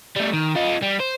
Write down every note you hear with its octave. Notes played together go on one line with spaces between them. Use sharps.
G3 A3
D#3
F4 D#5
G3
C5